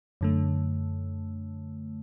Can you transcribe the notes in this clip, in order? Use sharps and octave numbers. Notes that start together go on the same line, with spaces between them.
F#2 D3 A3